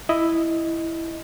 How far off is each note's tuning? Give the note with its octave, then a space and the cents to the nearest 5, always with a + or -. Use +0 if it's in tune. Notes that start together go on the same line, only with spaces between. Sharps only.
E4 +0 D#5 +0